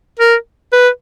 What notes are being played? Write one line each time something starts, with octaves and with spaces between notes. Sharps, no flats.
A#4
B4